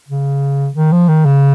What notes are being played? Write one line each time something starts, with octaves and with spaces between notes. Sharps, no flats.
C#3
D#3
F3
D#3
C#3